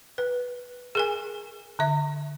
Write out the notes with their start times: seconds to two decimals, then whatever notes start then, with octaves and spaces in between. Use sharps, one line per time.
0.18 B4
0.95 G#4 A#4 G#5
1.79 D3 E5